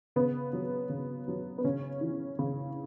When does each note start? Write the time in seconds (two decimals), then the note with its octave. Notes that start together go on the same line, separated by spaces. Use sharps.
0.16 C#3 B3
0.53 F#3
0.89 C#3
1.28 F#3
1.58 B3
1.64 C#3 C#4
2.01 E3
2.39 C#3